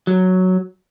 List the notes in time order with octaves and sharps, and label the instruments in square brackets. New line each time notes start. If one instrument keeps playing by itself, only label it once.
[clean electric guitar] F#3